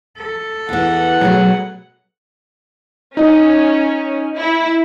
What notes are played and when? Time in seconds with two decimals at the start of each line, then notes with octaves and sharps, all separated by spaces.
0.18 A4
0.69 E2 E3 F#5
1.21 B2 F#3 A3 G#4
3.17 C#4 D#4 D#5
4.37 E4